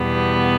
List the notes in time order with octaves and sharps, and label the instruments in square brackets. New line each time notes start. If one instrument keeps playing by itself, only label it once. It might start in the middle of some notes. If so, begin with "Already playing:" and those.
Already playing: [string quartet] E2 B2 G3 B3